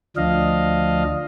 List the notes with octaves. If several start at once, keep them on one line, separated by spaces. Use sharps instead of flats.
D2 F3 D4 D#5 F5